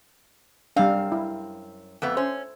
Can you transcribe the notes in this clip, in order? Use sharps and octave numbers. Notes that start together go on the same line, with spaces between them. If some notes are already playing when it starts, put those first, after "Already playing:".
F#2 G3 C4 D4 F5
E4
F2 A3 B3
C#4 C5